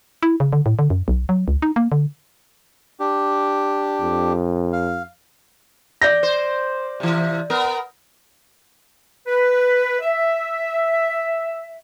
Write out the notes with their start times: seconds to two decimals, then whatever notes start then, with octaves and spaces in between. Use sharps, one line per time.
0.23 E4
0.40 C#3
0.53 D3
0.66 A2
0.79 D3
0.90 F#2
1.08 B1
1.29 F#3
1.48 C#2
1.62 D#4
1.76 A#3
1.92 D3
3.00 D4 G4
4.01 F2
4.73 F5
6.02 D5 G6 A#6
6.23 C5
7.00 C3 E3
7.50 B3 A#4
9.27 B4
10.01 E5